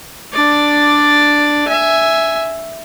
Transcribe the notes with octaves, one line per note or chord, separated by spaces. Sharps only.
D4 D5
E5 G#5